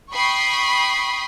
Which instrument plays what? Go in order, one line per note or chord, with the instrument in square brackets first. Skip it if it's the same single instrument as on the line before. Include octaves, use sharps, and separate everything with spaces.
[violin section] G5 B5 C#6 D#6 C7